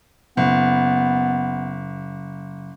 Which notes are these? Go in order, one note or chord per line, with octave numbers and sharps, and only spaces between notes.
F#1 B3